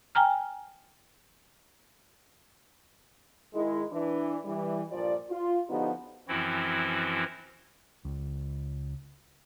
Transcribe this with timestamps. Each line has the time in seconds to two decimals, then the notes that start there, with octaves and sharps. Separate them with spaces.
0.15 G5 G#5 A#5 F6
3.54 D#3 G#3 E4
3.92 E3 D4
4.45 E3 G3
4.92 G2 A#2 F3 F4 D5
5.30 F4
5.69 D3 F3 B3 D#4 F#4 G4
6.28 F#2 E3 F3 C4 E4 F#4
8.05 C#2